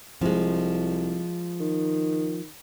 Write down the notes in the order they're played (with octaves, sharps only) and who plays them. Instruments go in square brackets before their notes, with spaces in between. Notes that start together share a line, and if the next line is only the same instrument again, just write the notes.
[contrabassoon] C2 [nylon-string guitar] F3 G#3
[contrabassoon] D#3